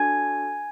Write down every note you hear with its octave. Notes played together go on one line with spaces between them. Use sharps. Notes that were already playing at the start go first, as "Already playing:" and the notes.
Already playing: D4 F#4 A4 G#5 G#6